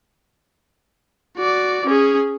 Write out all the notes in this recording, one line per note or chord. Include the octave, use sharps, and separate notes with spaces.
F#4 D5
C#4 G#4